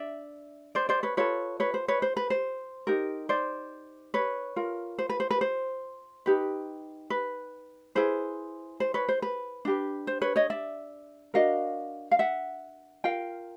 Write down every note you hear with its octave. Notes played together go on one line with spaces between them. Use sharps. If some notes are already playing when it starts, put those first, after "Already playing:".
Already playing: D4 D5 E5
C5 D5
C5 D5
B4 C#5
F4 A4 B4 C#5
B4 C#5
C5
B4 C#5
C5
B4
C5
D#4 G4 A#4
C5 D5
B4 C#5
F4 A#4
C5
B4
C5
B4
C5
D#4 G4 B4
B4
E4 G#4 B4 C5
C5
B4 C#5
C5
B4
D4 G4 B4
C5
B4 C#5
C#5 D#5
D5 E5
D4 F#4 A#4 D#5 F5
F5
E5 F#5
F4 A#4 F5 G5